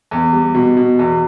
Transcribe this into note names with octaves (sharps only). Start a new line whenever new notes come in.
E2
G3
B2
B2
E2